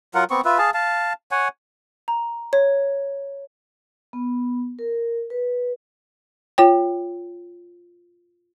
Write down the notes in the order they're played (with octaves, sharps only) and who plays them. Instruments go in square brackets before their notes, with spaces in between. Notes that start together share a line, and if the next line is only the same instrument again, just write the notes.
[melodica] F#3 F4 A#4 F#5
B3 C4 C#6
F4 B4 E5
G#4 F5 A5
F5 A5
C#5 F#5 G#5
[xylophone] A#5
C#5
[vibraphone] B3
A#4
B4
[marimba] F4 C#5 G5